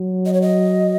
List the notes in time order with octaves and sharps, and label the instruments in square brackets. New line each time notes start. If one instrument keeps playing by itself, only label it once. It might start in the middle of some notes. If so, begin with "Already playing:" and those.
Already playing: [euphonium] F#3
[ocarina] D#5
C#5
D#5